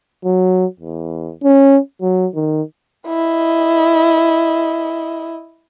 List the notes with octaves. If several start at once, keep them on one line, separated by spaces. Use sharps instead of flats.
F#3
E2
C#4
F#3
D#3
E4 D#5